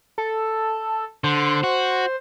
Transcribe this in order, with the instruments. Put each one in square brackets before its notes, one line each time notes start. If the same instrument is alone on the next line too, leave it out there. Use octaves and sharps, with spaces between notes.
[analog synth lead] A4
[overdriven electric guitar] D3 [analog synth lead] C5
[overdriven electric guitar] F#4